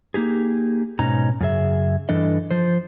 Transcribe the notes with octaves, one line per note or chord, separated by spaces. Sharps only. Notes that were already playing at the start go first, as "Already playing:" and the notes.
A#3 D#4 G4 G#4
G#2 B2 C#4 D#4 A#5
F#2 C#3 G#4 E5
G2 E3 D4 A4 D#5
F3 C5